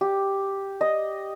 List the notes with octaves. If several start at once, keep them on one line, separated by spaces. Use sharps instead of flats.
G4
D#5